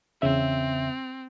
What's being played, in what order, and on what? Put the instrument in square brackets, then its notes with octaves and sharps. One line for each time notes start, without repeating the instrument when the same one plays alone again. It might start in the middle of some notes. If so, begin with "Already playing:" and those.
[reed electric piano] E2 C#3 E5 [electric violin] C4